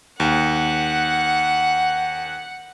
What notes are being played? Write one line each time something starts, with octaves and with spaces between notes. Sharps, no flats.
D#2 F#5